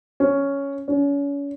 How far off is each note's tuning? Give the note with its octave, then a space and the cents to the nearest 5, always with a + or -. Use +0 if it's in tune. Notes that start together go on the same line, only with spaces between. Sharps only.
C#4 +5
C#4 +35